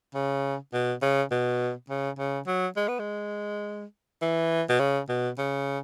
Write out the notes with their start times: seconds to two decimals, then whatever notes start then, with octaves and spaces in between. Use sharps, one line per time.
0.15 C#3
0.73 B2
1.02 C#3
1.31 B2
1.90 C#3
2.19 C#3
2.47 F#3
2.76 G#3
2.88 B3
2.99 G#3
4.22 E3
4.69 B2
4.79 C#3
5.09 B2
5.38 C#3